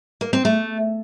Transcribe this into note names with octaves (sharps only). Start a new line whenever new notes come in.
A#3
C4
A3